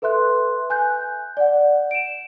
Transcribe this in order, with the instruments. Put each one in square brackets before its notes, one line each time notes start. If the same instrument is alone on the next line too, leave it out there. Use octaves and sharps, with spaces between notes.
[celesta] A4 B4 E5 C6 F#6
G#5 F#6 G6
D5 F#5
D7 E7